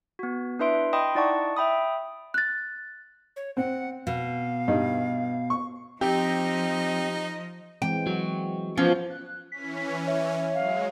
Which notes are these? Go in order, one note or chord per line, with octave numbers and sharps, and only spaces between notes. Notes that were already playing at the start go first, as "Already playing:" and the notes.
B3 F#4
D4 E4 B4 E5 C6 D7
D#5 G5 B5 C6 D#6
D#4 E4 D5 F#5 A5 C#6
E5 G5 B5 D#6
F#6 A6
C#5
C4 F#5
B2 F5
G2 D#4
C#6
F3 C4 D#4 G4 D#5
E3 G#3 C4 G5
F#3 F#4
F3 B3 C#4 F4
F#6
E3 C#4 B6
C#5 E5
F#3 G#3 F5